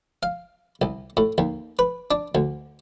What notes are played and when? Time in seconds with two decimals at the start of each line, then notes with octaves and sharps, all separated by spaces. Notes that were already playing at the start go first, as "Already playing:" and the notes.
0.23 F5
0.82 C2
1.17 A2
1.38 D#2
1.79 B4
2.11 D4
2.35 D2